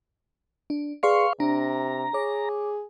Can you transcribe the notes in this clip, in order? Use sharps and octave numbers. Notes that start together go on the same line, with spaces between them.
D4
G#4 B4 D5 F5 C6 C#6
C3 D4 A#5
G#4 C#5 D6